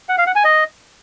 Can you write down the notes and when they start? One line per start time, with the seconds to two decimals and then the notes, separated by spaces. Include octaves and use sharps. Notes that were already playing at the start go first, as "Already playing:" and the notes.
0.09 F#5
0.18 F5
0.27 F#5
0.35 G#5
0.44 D#5